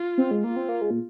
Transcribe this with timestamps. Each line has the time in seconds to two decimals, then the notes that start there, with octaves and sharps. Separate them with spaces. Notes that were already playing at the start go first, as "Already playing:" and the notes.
Already playing: F4
0.18 C4
0.31 G#3
0.43 A#3 F4
0.56 C4
0.69 A#3
0.82 G#3
0.91 A#2